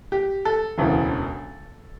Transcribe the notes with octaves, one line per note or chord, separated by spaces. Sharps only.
G4
A4
E1 D2 C#3 E3